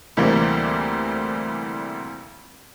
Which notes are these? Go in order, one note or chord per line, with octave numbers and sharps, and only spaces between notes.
D2 C3 E3 G3 A#3 C4